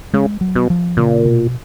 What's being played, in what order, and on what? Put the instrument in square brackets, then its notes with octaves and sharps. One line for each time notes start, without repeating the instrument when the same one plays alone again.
[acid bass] C#3 [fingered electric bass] G#3
[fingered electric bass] F#3
[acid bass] B2
[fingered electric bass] F3
[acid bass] A#2 [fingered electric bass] C#3
[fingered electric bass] B2